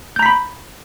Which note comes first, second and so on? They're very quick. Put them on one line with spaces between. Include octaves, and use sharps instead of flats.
G6 A#5 B6 B5